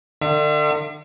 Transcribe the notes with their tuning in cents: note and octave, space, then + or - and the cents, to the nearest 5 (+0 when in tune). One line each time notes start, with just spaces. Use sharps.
D3 +40 E5 +45